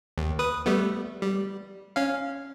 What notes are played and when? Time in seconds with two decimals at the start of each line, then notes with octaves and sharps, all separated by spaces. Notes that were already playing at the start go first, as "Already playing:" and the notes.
0.18 D#2
0.39 B4 D#6
0.66 G3 A3 B3
1.22 G3
1.96 C#4 F5